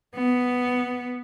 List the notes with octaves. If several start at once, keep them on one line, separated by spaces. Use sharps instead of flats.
B3